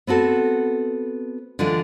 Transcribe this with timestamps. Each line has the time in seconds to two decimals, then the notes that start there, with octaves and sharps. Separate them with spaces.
0.07 B3 C4 F#4 A4
1.59 D3 E3 G#3 F4